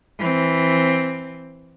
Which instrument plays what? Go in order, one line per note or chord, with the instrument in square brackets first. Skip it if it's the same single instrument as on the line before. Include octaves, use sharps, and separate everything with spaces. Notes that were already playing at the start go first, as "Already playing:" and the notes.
[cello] E3 C4